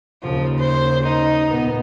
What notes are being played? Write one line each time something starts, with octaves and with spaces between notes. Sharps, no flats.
D#2 C#3 F3
C5
D#4
A#2 B3